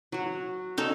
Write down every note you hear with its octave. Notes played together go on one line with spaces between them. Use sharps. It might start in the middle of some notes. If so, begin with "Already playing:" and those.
F#3 F#4
C#4 D#4 A4